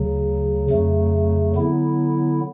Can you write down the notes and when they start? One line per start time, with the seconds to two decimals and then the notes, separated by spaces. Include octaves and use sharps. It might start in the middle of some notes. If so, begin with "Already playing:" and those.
Already playing: D2 C#3 F#3
0.70 F2 C#3 F#3 A3
1.55 D3 F#3 B3 E4